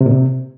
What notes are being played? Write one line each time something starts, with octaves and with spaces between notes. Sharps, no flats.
C3
A#2
C3